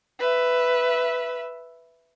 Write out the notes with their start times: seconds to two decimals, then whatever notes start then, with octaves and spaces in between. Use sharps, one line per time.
0.19 B4 E5